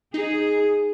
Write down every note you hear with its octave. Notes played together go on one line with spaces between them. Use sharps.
D#4 G#4